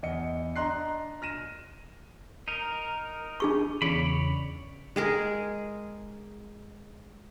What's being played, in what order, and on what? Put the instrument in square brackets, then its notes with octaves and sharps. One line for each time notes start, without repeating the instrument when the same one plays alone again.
[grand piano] E2 D#5 C#7
D4 D#5 A#5 C6 F#6 C7
F6 A#6 D#7 E7
[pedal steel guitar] D#4 A#4
[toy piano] D4 G#4 C#6
[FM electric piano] E2 C#3 [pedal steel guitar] C#5 D5 B5
[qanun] G#3 G#4 A#4